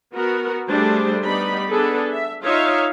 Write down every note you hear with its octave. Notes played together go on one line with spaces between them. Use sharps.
B3 F#4 A#4
G3 A3 D4 G#4 C5
G3 B3 D#4 D5 B5
B3 D4 G#4 A4 B4
E5
D#4 F4 C#5 E5 F5